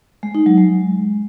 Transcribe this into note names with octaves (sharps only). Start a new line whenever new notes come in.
G#3
D#4
F#3
G#3